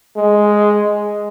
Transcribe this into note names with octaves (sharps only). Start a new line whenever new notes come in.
G#3